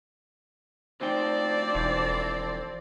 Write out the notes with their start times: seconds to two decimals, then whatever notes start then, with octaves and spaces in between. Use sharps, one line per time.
1.01 D2 F3 C4 D#4 C5 D5 G5
1.75 E1 E3